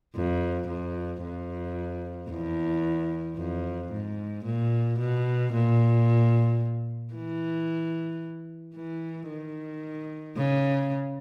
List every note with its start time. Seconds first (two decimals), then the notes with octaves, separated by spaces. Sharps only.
0.15 F2
0.68 F2
1.22 F2
2.30 E2
3.37 F2
3.92 G#2
4.45 A#2
4.99 B2
5.53 A#2
7.14 E3
8.75 E3
9.29 D#3
10.37 C#3